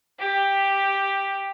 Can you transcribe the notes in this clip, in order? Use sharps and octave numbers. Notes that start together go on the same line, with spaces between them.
G4